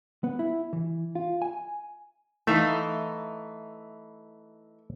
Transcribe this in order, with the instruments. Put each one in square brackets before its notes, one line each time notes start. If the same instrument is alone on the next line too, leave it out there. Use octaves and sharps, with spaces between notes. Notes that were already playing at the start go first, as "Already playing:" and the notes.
[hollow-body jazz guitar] B3
E4
E3
F4
G#5
[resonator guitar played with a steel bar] E3 D#4 [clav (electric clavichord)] A3 E5 F5